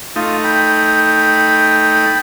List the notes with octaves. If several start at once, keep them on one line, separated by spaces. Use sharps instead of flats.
A3 D#4 F4
G5 B5